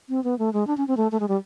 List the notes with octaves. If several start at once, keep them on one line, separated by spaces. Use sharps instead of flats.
C4
B3
A3
G#3
D4
C#4
C4
A3
A3
G#3
G3